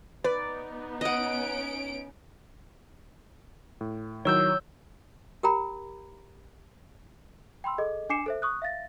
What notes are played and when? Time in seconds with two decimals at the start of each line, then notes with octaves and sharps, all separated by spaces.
0.24 B3 D#4 B4 D5
1.01 C#4 D#5 F#5 D7
3.81 A2
4.25 D#3 F#3 E4 C#5 E6 G6
5.43 G4 A#4 G5 A#5 B5
7.64 G5 B5 C6 E6
7.78 G#4 A4 D#5
8.10 D4 G#5 D6 C7 C#7 E7
8.26 A4 C5 E5
8.42 C#6 D#6 F#6
8.62 E5 F5 A6 A#6